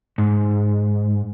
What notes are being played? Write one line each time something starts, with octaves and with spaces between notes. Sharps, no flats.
G#2